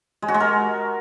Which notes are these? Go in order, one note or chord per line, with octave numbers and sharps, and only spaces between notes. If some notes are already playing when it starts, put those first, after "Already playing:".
G#3
F#4
G#3
A#4